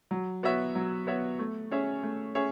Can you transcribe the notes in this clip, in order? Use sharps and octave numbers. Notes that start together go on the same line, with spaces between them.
F#3
B3 F#4 C#5 E5
F#3
B3 F#4 C#5 E5
A3
C#4 G#4 C#5 E5
A3
C#4 G#4 C#5 E5